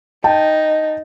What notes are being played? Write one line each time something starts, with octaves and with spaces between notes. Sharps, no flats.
D#4 G5 A5